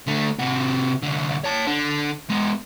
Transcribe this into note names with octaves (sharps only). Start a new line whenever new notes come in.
D3 A3
C3 F#4
C2 D3
C#5 A5
D3
G#3 B3